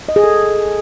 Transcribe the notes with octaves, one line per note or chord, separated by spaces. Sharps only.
D#5
G#4
A4